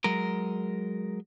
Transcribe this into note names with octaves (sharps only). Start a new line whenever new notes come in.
F#3 G#3 A#4